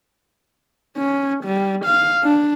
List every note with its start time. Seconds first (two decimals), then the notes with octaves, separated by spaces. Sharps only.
0.97 C#4
1.45 G3
1.85 F5
2.24 D4